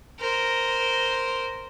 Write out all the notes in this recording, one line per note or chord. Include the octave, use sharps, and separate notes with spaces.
A#4 C5